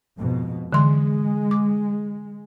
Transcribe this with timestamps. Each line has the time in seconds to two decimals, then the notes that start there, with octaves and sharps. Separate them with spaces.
0.16 F2 G#2 B2
0.73 D3 E3 G#3 C6
1.51 D6